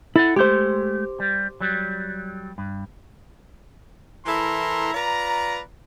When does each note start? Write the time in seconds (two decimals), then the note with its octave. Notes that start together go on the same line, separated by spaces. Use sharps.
0.16 E4 A4 F#5
0.36 G#3 A3 G4 C5
1.20 G3
1.61 F#3 G3
2.58 G2
4.26 E3 E4 A4 A#4 A#5 C6
4.94 F4 B4 D5 A#5